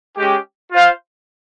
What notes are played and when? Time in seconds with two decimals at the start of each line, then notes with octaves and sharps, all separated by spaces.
0.18 G#3 C#4 G4
0.72 F4 C5 F5